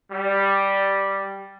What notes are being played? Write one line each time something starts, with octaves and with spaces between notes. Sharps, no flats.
G3